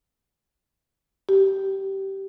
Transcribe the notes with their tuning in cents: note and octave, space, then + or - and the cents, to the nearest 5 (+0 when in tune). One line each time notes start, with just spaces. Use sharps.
G4 -15